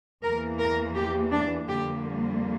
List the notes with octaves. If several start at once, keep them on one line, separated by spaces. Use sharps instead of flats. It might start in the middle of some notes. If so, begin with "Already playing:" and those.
E2 E3 A#3 A#4
A#4
G4
D4
F2 D3 G3 A#3 G4